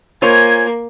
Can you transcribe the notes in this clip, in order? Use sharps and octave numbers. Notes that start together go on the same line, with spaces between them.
A#3 F4 C5 C#5 G#5